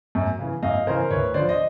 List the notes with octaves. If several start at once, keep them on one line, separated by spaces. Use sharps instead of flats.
F#2
C#3 E3
F#2 D#5 F5
C#3 E3 A#4 C5
D2 B4 C#5
D3 F3 C5 D5
D#5